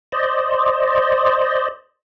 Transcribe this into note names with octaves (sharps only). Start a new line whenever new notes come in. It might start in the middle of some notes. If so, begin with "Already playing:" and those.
C5 D5 D#5